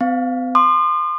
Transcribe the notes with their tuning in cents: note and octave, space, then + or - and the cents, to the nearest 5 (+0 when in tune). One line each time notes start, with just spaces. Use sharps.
C4 -45 F5 +0
C6 +0 D#6 -45